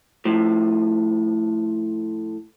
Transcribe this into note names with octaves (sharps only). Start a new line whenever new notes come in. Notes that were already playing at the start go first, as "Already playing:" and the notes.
A2 F3